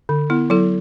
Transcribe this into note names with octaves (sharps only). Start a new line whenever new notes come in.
D3
B3 E4
F#3 E4 A4